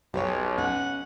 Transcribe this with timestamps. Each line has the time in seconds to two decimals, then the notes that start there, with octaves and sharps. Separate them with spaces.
0.14 B1 G4 B4 C#5
0.58 C#4 F#5